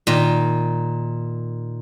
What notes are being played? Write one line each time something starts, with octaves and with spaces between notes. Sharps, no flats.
A#2 D#3